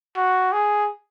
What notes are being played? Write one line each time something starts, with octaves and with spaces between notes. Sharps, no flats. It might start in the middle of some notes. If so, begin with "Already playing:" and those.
F#4
G#4